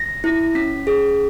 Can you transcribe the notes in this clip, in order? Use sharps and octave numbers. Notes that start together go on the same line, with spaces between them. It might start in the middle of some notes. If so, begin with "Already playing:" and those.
Already playing: A#6
E4
C#4 B6
G#4